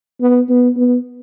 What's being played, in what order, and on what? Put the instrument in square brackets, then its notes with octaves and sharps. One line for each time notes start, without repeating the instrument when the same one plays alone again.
[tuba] B3
B3
B3